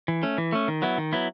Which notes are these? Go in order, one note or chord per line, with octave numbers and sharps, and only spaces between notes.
E3
A3 C#4
E3
A3 C#4
D#3
F#3 B3 E4
D#3
F#3 B3 E4